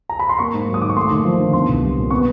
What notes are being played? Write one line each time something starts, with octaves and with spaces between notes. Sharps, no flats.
A#5
B5
C6
A#3 C#6
G#2
F#3
D#6
D#3 D6
C#6
A3 C6
D#2
F3
D3
B3 C6
C2
G3
A#2
B3 C#6